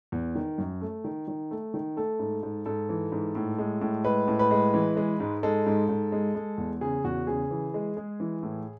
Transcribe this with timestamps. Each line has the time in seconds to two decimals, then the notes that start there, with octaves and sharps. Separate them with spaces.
0.12 E2
0.35 D#3
0.58 F#2
0.81 A3
1.04 D#3
1.28 D#3
1.51 A3
1.74 D#3
1.97 A3 A4
2.19 G#2
2.43 G#2
2.66 G#2 A4
2.89 E3
3.12 G#2
3.35 A2
3.59 G#3
3.81 A2
4.04 G#3 B4
4.28 A2
4.39 B4
4.51 G#3
4.74 E3
4.97 G#3
5.20 G#2
5.43 G#3 A4
5.66 G#2
5.89 G#2
6.12 G#3
6.35 G#3
6.58 E2
6.81 C#3 G#4
7.04 E2 F#4
7.27 C#3 G#4
7.51 E3
7.74 G#3
7.97 G#3
8.20 E3
8.43 A2